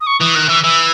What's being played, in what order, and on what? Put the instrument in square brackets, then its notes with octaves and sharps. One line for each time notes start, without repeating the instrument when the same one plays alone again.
[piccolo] D#6
C#6
[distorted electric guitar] E3 [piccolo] D#6
[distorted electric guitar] D#3 [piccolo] F#6
[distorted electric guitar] E3 [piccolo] E6
[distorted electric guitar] E3 [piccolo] E6